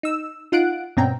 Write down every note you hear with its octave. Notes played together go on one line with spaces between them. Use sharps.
D#4 E6
D#4 F4 F#5 F#6 D7
G2 B2 C4 C#4 G5 A#5